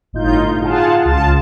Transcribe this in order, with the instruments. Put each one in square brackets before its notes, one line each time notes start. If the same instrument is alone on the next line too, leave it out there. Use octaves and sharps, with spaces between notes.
[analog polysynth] G1 A2 D#4 F4 G6
F4 G#4 F5 F#5 A5
C#2 F4 A5